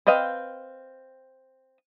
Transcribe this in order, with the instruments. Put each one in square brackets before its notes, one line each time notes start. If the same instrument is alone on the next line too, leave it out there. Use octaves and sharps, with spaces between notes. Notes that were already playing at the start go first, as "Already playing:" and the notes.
[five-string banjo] C4 B4 D#5 F5 G5